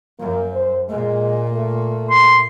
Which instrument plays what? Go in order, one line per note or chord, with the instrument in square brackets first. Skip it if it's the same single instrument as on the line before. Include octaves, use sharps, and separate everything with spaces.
[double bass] F#2 [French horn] A#3
[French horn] C5
[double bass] A#2 [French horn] G#3
[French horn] A3
[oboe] C6